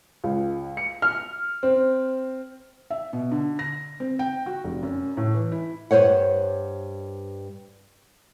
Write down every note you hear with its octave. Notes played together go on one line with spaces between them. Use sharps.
C#2
C#7
F6
C4
E5
B2
D3
A#6
C4
G5
F#4
F1
F#2
A2
E3
E4
G2 C#3 C5 C#5 F#5